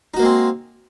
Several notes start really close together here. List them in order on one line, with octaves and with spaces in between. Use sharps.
D#4 F#4 A#3 G#3 C4